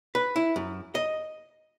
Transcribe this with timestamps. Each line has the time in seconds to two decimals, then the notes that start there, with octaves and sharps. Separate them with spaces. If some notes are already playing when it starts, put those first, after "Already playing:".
0.15 B4
0.36 E4
0.56 F#2
0.95 D#5